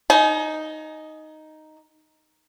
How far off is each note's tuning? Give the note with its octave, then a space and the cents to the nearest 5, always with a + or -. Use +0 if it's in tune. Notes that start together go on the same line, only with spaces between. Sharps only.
D#4 +0 G#5 +35